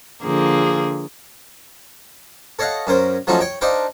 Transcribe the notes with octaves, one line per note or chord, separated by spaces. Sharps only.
D3 F3 A#3 G#4
A4 C#5 D#5 F5 F#5
F#2 C#4 A#4 C5
F3 F#3 A3 C#4 D#4 F4
C#5 G5
D4 D#4 C5 F5 G5